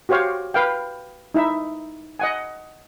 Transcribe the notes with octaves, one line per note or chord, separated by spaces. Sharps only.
F#4 G4 C5 C#5 F5
B4 F5 G5
D#4 E4 E5
D#5 F#5 G#5